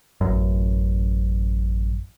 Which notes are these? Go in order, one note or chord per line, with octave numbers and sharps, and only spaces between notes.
A1 F#2